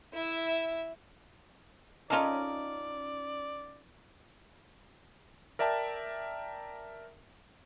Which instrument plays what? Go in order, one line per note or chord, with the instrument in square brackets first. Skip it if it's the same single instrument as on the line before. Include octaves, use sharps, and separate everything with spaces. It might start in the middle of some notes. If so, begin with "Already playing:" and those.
[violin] E4 E5
[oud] C#4 D#4 [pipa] F4 A4 A#4 [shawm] D5
[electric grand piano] A#4 D5 E5 G5 A5